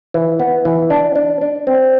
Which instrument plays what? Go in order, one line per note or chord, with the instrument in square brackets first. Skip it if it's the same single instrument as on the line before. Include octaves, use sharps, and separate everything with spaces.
[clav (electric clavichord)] E3
B3
E3
D4
D4
D4
C4